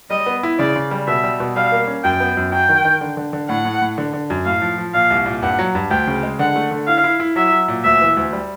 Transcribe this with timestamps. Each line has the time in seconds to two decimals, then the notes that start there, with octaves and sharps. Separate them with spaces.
0.10 G3 D#5
0.26 B3
0.43 E4
0.59 C#3 D5
0.76 C#3
0.91 G3
1.07 B2 E5
1.24 G3
1.40 B2
1.56 G3 F5
1.72 A#3
1.88 C#4
2.04 F#2 G5
2.20 B3
2.37 F#2
2.52 F#3 G5
2.69 D#3
2.85 D#3
3.01 D3
3.17 D3
3.33 D3
3.49 A2 F#5
3.65 A2
3.82 A2
3.98 D3
4.13 D3
4.30 F#2
4.45 A2 F5
4.62 F3
4.78 F3
4.94 A#2 F5
5.10 C2
5.26 A#2
5.42 G2 F#5
5.59 F#3
5.75 G2
5.91 D2 G5
6.07 C#3
6.23 G#3
6.39 D3 F#5
6.56 A3
6.71 D3
6.87 E4 F5
7.04 E4
7.20 E4
7.36 F#3 E5
7.52 F#3
7.68 A#2
7.84 D2 E5
8.01 E3
8.17 D2
8.33 G3